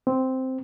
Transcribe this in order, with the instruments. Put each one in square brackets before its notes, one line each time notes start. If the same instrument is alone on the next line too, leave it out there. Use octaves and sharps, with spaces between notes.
[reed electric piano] C4